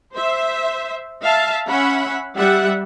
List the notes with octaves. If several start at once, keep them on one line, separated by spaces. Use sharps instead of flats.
C5 E5
E5 F5 A5
C#4 E5 F#5 B5
G3 E5 F#5